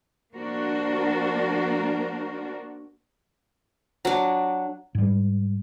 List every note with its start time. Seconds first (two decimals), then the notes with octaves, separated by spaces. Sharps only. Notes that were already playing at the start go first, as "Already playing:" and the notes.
0.34 F3 A#3 D4 F#4 A#4 C5
4.05 F#3 D4
4.95 G#2 G3